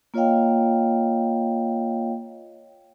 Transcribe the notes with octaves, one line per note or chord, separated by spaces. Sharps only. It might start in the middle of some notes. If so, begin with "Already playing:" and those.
A#3 F4 C#5 D#5 F5 G5